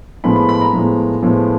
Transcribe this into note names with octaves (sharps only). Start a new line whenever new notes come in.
A2 F3 G#3 B3 B5
B5
B5
A#5
A2 F3 G#3 B3
A2 F3 G#3 B3